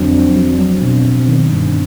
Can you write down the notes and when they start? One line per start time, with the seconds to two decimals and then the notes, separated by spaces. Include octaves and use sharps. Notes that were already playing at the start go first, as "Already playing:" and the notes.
Already playing: F2 D3 F#3 C4 D4
0.13 F2
0.36 F#3
0.59 F#3
0.82 B2
1.05 B2
1.28 D#3
1.51 G2